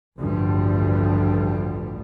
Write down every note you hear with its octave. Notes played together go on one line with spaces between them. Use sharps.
A1 D2 G2 F3 G3